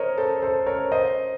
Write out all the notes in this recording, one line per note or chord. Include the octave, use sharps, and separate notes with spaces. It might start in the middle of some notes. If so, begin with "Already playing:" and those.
Already playing: A#4 C5 C#5 D#5
A4 C5
A4 C5
A#4 C#5
C5 D#5